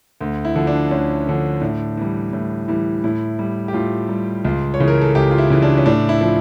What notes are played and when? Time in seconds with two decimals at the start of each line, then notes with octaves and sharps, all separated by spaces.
0.21 D2
0.45 E4
0.56 D3 F3
0.67 D4
0.91 D2 C#4
1.27 D3 F3
1.61 A2 D4
1.97 E3 G3
2.33 A2
2.68 E3 G3
3.04 A2 E4
3.39 G3
3.68 G4
3.73 A2 F4
4.09 G3
4.44 C#2 F4
4.74 C#5
4.80 C#3 E3
4.88 A#4
5.02 A4
5.15 C#2 G4
5.31 F4
5.38 E4
5.50 C#3 E3
5.62 D4
5.78 C#4
5.86 A2 D4
6.09 E4
6.21 F3